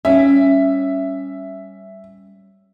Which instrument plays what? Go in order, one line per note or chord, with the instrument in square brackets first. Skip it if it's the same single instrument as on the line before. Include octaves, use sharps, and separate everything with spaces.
[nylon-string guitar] G3 C#4 [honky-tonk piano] E5